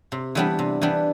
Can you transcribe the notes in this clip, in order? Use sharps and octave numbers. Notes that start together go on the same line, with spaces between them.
C3
E3 G3 B3 D4
C3
E3 G3 B3 D4